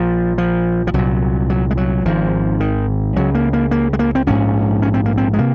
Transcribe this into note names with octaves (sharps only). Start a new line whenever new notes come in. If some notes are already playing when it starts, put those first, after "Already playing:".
Already playing: A#1 A#2 F3
F3
F3
C2 A#2 F#3
F#3
G#3
F#3
G#1 G#2 F3
D#3
C#2 C#3 F#3
A#3
A#3
A#3
G#3
A#3
C4
A#1 G#2 C#4
C#4
C4
A#3
C4
G#3
C3 A#3